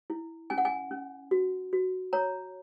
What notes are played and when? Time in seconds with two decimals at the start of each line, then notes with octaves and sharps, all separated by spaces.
0.10 E4
0.50 C#4 G#5
0.58 F#5
0.65 G#5
0.91 C#4
1.31 F#4
1.73 F#4
2.13 C#5 A#5